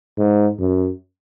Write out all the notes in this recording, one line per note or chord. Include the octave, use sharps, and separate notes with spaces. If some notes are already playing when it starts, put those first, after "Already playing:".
G#2
F#2